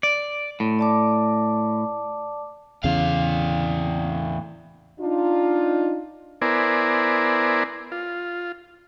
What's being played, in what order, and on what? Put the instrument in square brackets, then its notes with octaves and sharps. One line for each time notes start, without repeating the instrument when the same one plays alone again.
[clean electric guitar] D5
A2
[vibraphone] D5 A5 D6
[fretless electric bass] E2 C#3 [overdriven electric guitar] A2 F5
[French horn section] D4 D#4 F4
[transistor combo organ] B3 E4 A#4 C5 D5 G#5
F4